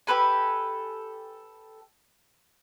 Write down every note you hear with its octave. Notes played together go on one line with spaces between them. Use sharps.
G4 A4 B4 G#5